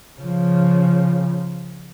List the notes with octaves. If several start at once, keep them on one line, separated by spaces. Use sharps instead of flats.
C#3 F3